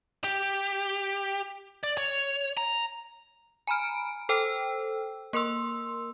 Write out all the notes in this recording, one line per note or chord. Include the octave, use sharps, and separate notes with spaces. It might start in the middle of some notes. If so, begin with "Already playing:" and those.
G4
D5
C#5
A#5
G#5 A#5 B5 F6 D7
A4 C5 G5 E6
A#3 A#4 C6 E6